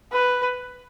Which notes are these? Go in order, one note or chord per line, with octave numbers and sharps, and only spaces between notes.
B4